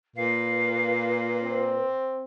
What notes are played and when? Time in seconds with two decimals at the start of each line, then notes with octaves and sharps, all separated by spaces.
0.16 A#2 B4 F5
1.43 C4